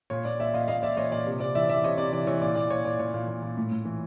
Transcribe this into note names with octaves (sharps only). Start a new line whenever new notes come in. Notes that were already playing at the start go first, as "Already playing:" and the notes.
A#2 C#5
A#2 D5
A#2 D5 E5
A#2 D#5 F5
A#2 D#5 F5
A#2 D5 E5
A#2 C#5 D#5
A#2 D5
C3
C3 D5
E3 D5 E5
E3 D5 E5
C3 C#5 D#5
C3 D5
E3 D5
E3 C#5
A#2 D5
A#2 D5
A#2 C#5
A#2 D5
A#2 C#5
A#2
A#2
A#2
A2
A2
E3